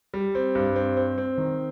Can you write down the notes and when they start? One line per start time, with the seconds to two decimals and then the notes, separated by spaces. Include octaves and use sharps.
0.14 G3
0.35 C4
0.55 G2
0.76 C4
0.97 C4
1.18 C4
1.38 D#3